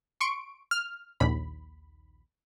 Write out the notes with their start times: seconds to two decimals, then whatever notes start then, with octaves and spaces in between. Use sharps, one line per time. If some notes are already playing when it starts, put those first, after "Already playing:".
0.21 C6 C#6 D7
0.71 F6
1.20 A#1 D#2 B5